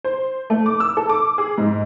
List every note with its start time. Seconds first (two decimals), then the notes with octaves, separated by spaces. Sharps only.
0.04 C5
0.50 A3
0.66 D6
0.80 E6
0.97 A4
1.09 D6
1.38 G#4
1.58 G#2